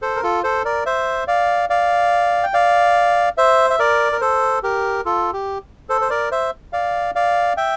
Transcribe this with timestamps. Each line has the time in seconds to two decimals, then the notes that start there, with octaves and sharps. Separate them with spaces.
0.02 A4 C5
0.16 A#4
0.23 F4 A4
0.43 A4 C5
0.65 A#4 D5
0.86 C5 E5
1.28 D5 F5
1.70 D5 F5
2.43 G5
2.54 D5 F5
3.37 C5 E5
3.70 E5
3.79 A#4 D5
4.12 A#4
4.21 A4 C5
4.63 G4 A#4
5.06 F4 A4
5.33 G4
5.89 A4 C5
6.01 C5
6.10 A#4 D5
6.31 C5 E5
6.73 D5 F5
7.15 D5 F5
7.57 E5 G5